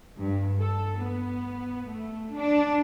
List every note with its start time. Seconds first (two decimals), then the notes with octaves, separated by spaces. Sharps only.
0.20 G2
0.60 A4
0.98 B3
1.89 A3
2.35 D4